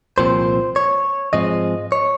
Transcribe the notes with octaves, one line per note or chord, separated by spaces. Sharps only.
C2 A#2 F3 C4 C5
C#5
G#2 F3 G#3 C4 D#5
C#5